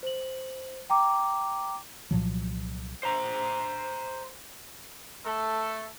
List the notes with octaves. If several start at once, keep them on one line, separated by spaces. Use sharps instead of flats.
C5 F#7
G5 A#5 D6
C2 A#2 F3 F#3
C5 A#5
A3 A4